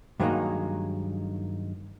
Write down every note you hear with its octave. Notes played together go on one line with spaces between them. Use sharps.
G2 D#3 F#3 G#3 A#3 D#4